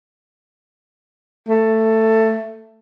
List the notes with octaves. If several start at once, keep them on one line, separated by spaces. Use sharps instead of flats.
A3